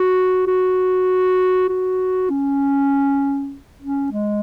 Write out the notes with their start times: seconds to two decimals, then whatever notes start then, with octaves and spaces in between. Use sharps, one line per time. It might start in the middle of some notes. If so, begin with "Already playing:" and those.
Already playing: F#4
0.47 F#4
1.69 F#4
2.30 C#4
3.82 C#4
4.12 G#3